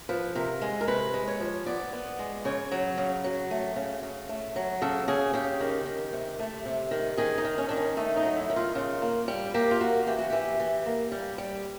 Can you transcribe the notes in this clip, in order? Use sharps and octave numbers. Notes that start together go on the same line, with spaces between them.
F3 B4
C3 A#4
G#3
A#4
C3 B4
G#3
C#5
F3
B3 D5
B3
G#3
C#3 C#5
F#3
C#3
F#3
A3
C#3
C#3
A3
F#3
C#3 A4
C#3 G#4
C#3 G4
D#3
D#3
C3
A3
C3
D#3
D#3 G#4
D#4
D#3
C#4
D#3 D4
C#4
A3 D#4
D#4
F#3
E4
D#3
F4
C#3 F4
A#3
G3
A#3 G4
F4
A#3 F#4
E3 G4
F#4
E3 G4
E3
A#3
G3
G3